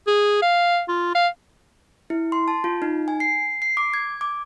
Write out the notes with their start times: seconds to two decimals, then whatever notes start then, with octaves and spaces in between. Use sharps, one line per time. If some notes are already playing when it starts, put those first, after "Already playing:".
0.07 G#4
0.42 F5
0.89 F4
1.15 F5
2.10 E4
2.32 C6
2.48 A5
2.64 F4
2.82 D#4
3.08 G#5
3.20 C7
3.62 C7
3.77 D6
3.94 G#6
4.21 D6